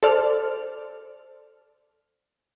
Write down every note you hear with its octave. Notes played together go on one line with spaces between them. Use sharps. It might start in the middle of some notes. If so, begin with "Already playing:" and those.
A4 C5 D5 F6